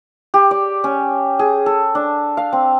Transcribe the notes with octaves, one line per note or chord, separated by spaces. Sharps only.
G4
D5
C#4
G#4
A4
D4
F5
C4